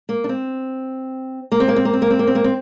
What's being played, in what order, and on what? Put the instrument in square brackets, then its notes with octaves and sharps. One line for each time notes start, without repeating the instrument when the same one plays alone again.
[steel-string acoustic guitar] A#3
D4
C4
A#3
C4
A#3
C4
A#3
C4
A#3
C4
A#3
C4
A#3
C4